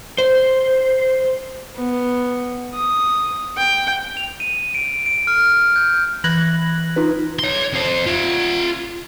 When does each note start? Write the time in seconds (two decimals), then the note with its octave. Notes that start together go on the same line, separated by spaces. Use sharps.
0.18 C5
1.76 B3
2.74 D#6
3.57 G5
4.17 F7
4.40 D#7
4.74 D7
5.06 D7
5.27 F6
5.76 G6
6.24 E3 B5 F#6 G#6 A#6 F#7
6.96 D#4 F4 B4
7.39 C#5 C6
7.73 F2 C5
8.06 F4 E5